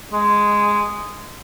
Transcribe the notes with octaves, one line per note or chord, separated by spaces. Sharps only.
G#3